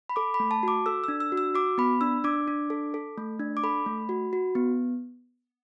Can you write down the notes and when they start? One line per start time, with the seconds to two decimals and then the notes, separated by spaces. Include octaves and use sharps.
0.09 B5
0.16 A4 D6
0.34 B5
0.40 A3
0.51 A5
0.63 F#4 D6
0.86 A4 E6
1.04 D4 E6
1.20 E6
1.32 F#4
1.37 E6
1.55 F#4 D6
1.78 B3 B5
2.01 D4 E6
2.24 D4 D6
2.48 D4
2.70 A4
2.94 A4
3.18 A3
3.40 D4
3.57 D6
3.63 A4 B5
3.86 A3
4.09 F#4
4.33 F#4
4.55 B3